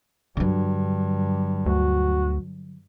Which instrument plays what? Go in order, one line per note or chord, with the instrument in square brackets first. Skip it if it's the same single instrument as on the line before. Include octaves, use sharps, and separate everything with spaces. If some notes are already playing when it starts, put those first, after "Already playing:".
[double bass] G2 [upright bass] D3 F#3
[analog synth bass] D2 [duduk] F#4